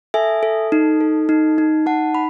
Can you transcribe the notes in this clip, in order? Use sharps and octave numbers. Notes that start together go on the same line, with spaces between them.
A4 E5 G#5
A4
D#4
A4
D#4
D#4
D#4 F#5 A5
B5